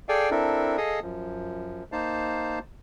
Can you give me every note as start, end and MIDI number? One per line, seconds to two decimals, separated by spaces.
0.09 0.30 68
0.09 0.30 69
0.09 0.30 74
0.09 0.30 77
0.09 0.30 79
0.09 0.30 80
0.31 0.77 60
0.31 0.77 62
0.31 0.77 64
0.31 0.77 69
0.31 0.77 70
0.78 1.00 68
0.78 1.00 69
0.78 1.00 75
0.78 1.00 77
0.78 1.00 87
1.02 1.84 42
1.02 1.84 53
1.92 2.59 58
1.92 2.59 63
1.92 2.59 72
1.92 2.59 77
1.92 2.59 81